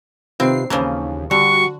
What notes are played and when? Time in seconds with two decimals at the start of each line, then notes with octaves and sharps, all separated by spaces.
0.40 C3 D#3 C4 F4 B4 C7
0.70 D#2 C#3 E3 F3 C#4 F5 A#5
1.31 D3 G3 F#4 C#6